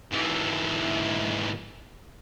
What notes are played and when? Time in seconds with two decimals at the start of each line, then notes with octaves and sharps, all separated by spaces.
0.12 G#2 E3